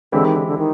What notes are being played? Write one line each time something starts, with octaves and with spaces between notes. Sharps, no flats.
D3 E3 G#3 C4 E4 G4
D#3
D3
D3
D#3